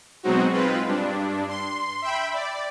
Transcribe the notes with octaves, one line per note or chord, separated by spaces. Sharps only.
B2 F#3 G#3 C4 D#4 F#4
G#3 C4 F4 B4
G2 D4
C6
E5 G5 B5
D5